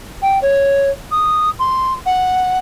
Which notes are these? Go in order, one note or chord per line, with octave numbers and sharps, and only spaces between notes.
G5
C#5
D#6
C6
F#5